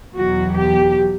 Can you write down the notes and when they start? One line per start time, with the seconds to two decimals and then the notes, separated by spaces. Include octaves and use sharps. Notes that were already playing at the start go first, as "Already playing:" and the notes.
0.15 E2 B2 F#3 F#4
0.57 G4